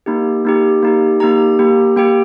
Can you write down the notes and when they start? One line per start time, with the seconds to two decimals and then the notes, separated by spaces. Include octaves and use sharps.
0.06 A#3 D#4 G4
0.45 A#3 D#4 G4
0.83 A#3 D#4 G4
1.20 A#3 D#4 G4 A#5
1.59 A#3 G4
1.96 A#3 G4 G5